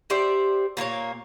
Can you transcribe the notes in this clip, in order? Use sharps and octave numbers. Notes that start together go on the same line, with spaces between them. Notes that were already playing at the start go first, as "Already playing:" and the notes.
G4 C5 D5 E5
A#2 A#3 D#4 C#5